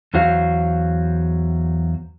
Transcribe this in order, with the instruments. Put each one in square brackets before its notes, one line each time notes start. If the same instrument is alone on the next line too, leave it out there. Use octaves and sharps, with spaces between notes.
[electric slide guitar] E2 F#3 F#4 C5 F5